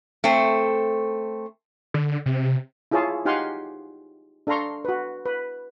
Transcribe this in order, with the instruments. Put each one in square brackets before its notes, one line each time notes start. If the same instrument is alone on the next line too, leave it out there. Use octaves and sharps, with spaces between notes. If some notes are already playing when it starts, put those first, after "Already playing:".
[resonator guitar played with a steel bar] A3 C4
[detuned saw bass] D3
C3
[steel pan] E4 F4 G#4 C#5 A5
D#4 G4 F5 F#5 G#5 C6
D4 A4 F5 A#5 C6 C#6
F#4 B4
B4